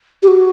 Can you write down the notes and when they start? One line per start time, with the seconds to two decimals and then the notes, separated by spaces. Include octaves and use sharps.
0.23 G4
0.28 F#4